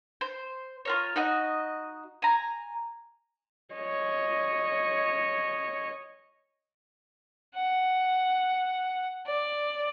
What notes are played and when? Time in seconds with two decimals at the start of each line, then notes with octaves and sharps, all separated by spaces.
0.21 C5
0.85 F4 A#4 C#5
1.16 D#4 F#4 D#5
2.22 G#5 A#5
3.74 C#5 D#5
7.55 F#5
9.27 D5